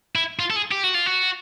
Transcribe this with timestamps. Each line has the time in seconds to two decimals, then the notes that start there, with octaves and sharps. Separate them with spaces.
0.15 E4
0.39 F4
0.50 A4
0.56 G#4
0.72 G4
0.84 F#4
0.95 F4
1.06 F#4